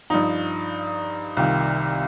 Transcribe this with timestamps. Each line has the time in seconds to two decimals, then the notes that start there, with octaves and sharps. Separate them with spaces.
0.10 G2 F3 D#4
1.37 C2 C3 D#3 F4